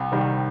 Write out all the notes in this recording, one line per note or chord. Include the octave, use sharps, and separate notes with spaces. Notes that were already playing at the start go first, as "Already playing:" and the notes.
Already playing: C2
C3 D#3 G3